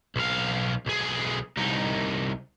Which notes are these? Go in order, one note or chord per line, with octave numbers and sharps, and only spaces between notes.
B1 F5
B1 G#4
C2 D#4